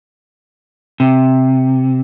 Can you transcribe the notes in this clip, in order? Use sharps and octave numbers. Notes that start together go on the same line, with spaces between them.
C3